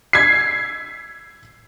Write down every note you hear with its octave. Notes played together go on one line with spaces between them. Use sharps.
G#6 B6 C7